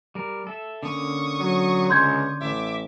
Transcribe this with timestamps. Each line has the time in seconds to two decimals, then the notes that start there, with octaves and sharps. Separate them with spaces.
0.15 G3 A#4
0.47 A4 E5
0.83 D3 A#3 C#4 C#6 D#6
1.40 F#3
1.90 C#2 C6 G6 G#6
2.40 A1 E5 D6